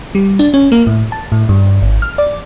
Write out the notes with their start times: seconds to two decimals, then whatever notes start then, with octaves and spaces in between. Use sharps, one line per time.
0.15 G3
0.39 D4
0.54 C#4
0.72 A#3
0.87 A2
1.12 A5
1.32 A2
1.49 G2
1.82 G#1
2.02 F6
2.18 D5